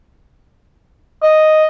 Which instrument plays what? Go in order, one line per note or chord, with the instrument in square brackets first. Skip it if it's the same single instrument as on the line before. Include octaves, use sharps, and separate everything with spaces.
[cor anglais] D#5